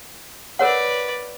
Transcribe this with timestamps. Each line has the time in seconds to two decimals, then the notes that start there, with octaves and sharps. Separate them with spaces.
0.59 A#4 B4 C#5 D5 F#5